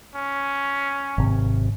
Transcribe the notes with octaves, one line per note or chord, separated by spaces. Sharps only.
C#4
G#1 C3